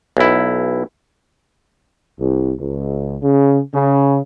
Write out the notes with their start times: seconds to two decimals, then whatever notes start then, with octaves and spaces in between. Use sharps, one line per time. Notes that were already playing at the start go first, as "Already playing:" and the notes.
0.17 B1 E4
2.19 C2
2.58 C#2
3.21 C#3
3.74 C#3